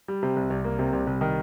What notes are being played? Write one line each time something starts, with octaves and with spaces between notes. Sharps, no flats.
G3
C3
C2
C2
A#3
C3
C2
C2
D#3